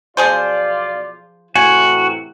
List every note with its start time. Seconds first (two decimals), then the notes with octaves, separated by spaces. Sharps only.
0.17 B1 F3 F4 G#4 C5 D5
1.55 A2 C3 E3 F#4 G#5